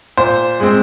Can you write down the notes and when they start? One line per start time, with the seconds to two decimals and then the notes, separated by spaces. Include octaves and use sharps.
0.17 A#2 C5
0.60 G#3 C4